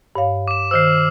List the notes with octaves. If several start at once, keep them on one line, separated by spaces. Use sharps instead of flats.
G2 C#5 F5
D6 E7
D#3 C5 E6 F6 C7